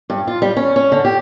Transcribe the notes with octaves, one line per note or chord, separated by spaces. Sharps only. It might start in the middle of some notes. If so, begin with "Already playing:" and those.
G2
F4
G3
C#4
C#4
D3
G4